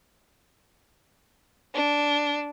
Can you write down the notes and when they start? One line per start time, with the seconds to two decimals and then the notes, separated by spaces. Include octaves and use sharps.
1.75 D4